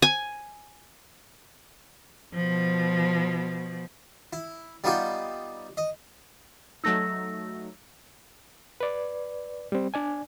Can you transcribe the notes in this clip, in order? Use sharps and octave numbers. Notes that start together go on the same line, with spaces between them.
G#5
B2 F3
E4
G3 B3 D#4 F4 G4
D#5
F#3 A3 D#4 E6 A#6
B4 D5
G3 C4
D4 D5 G#5